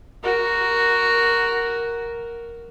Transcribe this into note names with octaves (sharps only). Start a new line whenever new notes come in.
F#4 A#4